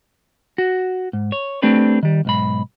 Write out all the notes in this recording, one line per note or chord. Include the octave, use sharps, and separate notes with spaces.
F#4
G#2
C#5
A3 C4 D4 G4 B4
D#3 G3
B1 G#2 B5